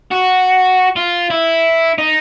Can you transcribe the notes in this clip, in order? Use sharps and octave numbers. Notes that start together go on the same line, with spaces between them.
F#4
F4
E4
D#4